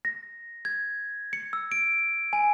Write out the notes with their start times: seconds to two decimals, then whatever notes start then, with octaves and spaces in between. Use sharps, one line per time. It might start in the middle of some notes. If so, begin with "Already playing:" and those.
0.05 A#6
0.65 G#6
1.33 C#7
1.53 E6
1.72 D7
2.33 G#5